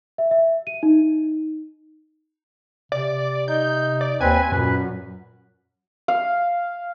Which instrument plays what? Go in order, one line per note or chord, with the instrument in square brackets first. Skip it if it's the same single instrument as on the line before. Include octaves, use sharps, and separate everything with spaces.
[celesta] E5
E5
D#7
D#4
[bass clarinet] C3 [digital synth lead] D5
[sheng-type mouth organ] D#4 [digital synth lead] G6
[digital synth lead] D5
[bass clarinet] D#2 [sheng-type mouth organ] C4 B4 [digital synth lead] G#5
[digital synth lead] F#2 [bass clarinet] A#2 [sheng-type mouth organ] B4
[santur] F5